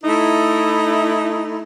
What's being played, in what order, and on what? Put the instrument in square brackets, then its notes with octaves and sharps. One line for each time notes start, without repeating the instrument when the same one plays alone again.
[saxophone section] A3 D#4 E4